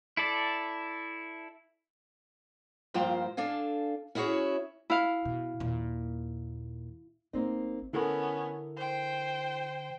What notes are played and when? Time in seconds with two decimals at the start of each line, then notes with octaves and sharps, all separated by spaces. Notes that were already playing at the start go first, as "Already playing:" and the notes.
0.17 E4 A4 D5
2.94 G2 F3 A#3 F4 C5 G5
3.37 D4 A4 F5 G#5
4.15 C#4 E4 F#4 G#4 C#5
4.90 E4 F5
5.25 B2
5.60 D#2 A#2
7.33 G#1 A#3 C4 D#4
7.93 D3 B3 C#4 E4 A4 A#4
8.76 C5 G5